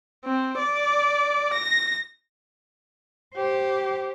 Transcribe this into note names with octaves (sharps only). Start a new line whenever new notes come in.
C4
D5
A#6
G4 C5